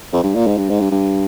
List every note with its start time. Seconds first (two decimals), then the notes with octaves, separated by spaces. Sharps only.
0.13 F2
0.24 G2
0.35 A#2
0.47 G#2
0.58 G2
0.69 G#2
0.81 G2
0.91 G2